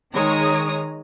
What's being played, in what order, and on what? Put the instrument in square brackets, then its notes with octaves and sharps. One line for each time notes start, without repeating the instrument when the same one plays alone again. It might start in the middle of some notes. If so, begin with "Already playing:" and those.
[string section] D#3 G#3 C#5 A#5 D#6